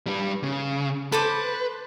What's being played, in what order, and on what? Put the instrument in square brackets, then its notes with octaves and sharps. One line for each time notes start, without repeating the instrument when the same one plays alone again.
[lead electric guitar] G3 B4
C#3
[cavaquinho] A4 C5 D6 [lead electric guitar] B4